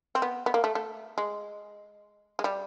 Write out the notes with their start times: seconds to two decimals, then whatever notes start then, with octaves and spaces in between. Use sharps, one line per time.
0.15 C4
0.22 B3
0.46 B3
0.54 A#3
0.64 A3
0.75 A3
1.18 G#3
2.39 G#3
2.44 G3